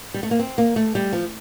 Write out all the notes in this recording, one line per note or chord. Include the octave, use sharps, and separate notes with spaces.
G3
A3
A#3
C4
A#3
A3
G3
F3